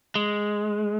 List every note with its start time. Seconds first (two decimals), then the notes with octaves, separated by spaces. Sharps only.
0.15 G#3